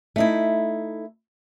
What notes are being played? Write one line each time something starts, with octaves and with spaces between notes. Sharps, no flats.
A3 D#4 E4